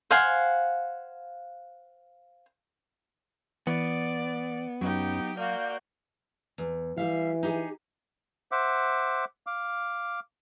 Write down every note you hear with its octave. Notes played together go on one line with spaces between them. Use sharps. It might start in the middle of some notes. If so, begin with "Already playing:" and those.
C5 F5 F#5 G#5
E3 B3 D5
F#2 F#3 C#4 D#4 G4
A#3 F#4 D5 F5 G6
E2
E3 G3 E5 F5
D#4 G4 G#4
C5 E5 F#5 D6
F5 D6